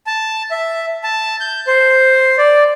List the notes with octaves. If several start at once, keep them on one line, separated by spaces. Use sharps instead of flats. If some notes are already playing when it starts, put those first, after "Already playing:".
A5
E5
A5
G6
C5
D5